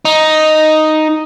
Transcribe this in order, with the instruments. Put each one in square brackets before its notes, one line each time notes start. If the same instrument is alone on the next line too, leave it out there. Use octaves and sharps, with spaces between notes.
[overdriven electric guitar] D#4